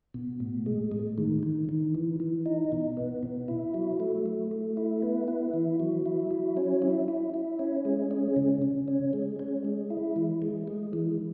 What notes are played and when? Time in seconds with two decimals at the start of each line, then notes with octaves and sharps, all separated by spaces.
0.14 B2
0.40 A2
0.66 G#3
0.92 A2
1.18 D#3
1.43 D#3
1.69 D#3
1.95 E3
2.20 E3
2.46 D#4
2.72 B2
2.97 B3
3.23 B2
3.48 E4
3.74 F#3
4.00 A3
4.26 A3
4.51 A3
4.77 E4
5.02 B3
5.28 E4
5.54 E3
5.80 F#3
6.06 E4
6.31 F#3
6.57 C#4
6.82 E4
7.08 E4
7.34 E4
7.59 C#4
7.85 G#3
8.11 C#4
8.36 C#3
8.62 C#3
8.88 C#4
9.13 G#3
9.39 C#4
9.65 G#3
9.90 E4
10.16 E3
10.42 G#3
10.68 G#3
10.93 E3